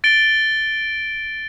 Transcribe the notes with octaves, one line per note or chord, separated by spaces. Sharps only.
A6 D7 G7